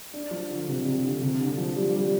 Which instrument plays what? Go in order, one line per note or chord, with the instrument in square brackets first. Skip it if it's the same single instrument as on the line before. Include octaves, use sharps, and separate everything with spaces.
[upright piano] D4
F3
D3
C3
C3
D3
C3
D3
F3
G3
G3